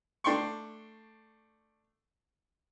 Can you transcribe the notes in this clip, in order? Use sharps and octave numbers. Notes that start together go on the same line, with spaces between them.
A3 D4 G5 C6 C#6